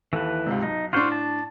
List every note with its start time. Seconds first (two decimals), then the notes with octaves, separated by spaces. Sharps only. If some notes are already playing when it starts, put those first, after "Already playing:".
0.13 D#2 E3 A4 B4
0.46 C#2 G#2 C3
0.63 B1 D#4
0.93 A2 D4 F4 F#4 C5
1.12 A5